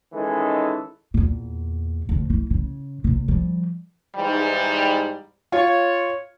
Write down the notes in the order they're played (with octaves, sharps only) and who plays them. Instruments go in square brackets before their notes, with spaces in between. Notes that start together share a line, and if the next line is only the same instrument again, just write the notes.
[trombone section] D#3 E3 G#3 C#4 D#4 A4
[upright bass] E2 A#2
D2 C3
E3
C#3
A#1 C3
F3 G3
[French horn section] G#2 E3 G3
[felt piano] F4 [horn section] C#5